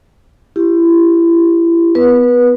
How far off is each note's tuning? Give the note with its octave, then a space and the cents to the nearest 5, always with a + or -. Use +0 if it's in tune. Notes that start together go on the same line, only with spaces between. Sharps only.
E4 +30 G4 +0
B3 +20 B4 -25